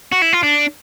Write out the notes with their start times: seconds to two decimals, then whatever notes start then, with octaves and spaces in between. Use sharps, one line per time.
0.12 F#4
0.22 E4
0.33 F4
0.43 D4